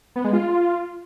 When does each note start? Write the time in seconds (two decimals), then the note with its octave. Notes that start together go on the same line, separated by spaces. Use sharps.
0.16 B3
0.24 G#3
0.33 F4